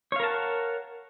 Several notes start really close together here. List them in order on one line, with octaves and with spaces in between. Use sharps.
C#5 F5 A#4 A5 F#5